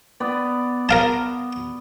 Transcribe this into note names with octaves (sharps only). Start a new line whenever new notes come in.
B3 D5
A#4 F5 A5